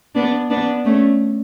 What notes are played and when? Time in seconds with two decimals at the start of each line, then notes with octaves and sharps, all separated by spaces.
0.15 B3 D4
0.50 B3 D4
0.85 A3 C#4